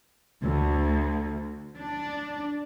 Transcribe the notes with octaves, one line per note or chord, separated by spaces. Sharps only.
D2
D4